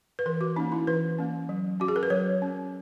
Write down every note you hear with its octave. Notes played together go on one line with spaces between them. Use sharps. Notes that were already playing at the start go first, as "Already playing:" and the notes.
B4
E3 A#4
F#4
A#3 C#4 D#4
E4
E3 B4
A#3 C#4
F#3
C#4 F#4
G#4
A#4
B4
F#3 C#5
C#4